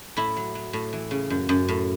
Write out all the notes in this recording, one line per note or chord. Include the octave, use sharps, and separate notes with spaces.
A2 E4
F#3
F#3
A2
E3
C#3
F#2
F#2
A2